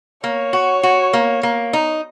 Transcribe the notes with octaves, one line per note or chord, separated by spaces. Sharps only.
A#3 C#5
F#4
F#4
A#3
A#3
D#4